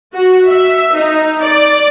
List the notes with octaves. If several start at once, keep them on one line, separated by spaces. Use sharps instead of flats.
F#4
E5
D#4
D5